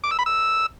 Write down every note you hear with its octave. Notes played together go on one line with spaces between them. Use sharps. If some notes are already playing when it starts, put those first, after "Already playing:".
D6
E6
B5
E6